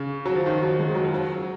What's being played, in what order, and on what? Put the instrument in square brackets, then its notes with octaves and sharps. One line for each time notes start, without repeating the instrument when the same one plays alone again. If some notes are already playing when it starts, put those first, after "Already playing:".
Already playing: [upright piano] C#3
F#3
F3
D#3
F#3
G#3
F#3
F3
F#3